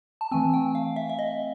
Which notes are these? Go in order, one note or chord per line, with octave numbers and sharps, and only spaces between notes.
A5
E3 A3 C4 G#5
G5
F5
E5
E5
D#5